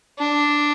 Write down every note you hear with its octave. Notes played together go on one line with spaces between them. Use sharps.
D4